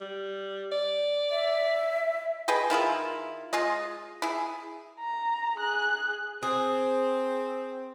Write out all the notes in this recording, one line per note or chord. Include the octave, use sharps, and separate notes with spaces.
G3
D5
E5
G#4 B4 D#5 G5
D#3 E4 F4 G#4
G#3 F4 G#4 D#5
E4 G#4
A#5
G#4 F#6
C4 G#4